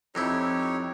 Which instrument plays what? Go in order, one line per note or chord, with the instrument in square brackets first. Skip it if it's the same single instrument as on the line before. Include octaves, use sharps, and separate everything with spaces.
[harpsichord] F2 C4 E4 [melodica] D#4 G4 C#5